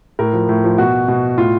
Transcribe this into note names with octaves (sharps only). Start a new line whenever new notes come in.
A2 A#4
F3
A2
F3
B2 F#4
B2
A2 F4